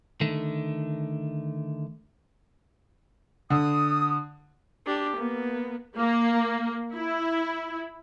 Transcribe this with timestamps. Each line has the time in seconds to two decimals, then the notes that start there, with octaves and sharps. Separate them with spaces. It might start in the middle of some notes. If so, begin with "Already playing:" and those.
0.21 D3 D#3 A3
3.50 D3 D#6
4.86 D4 G4
5.17 A#3 B3
5.96 A#3
6.95 E4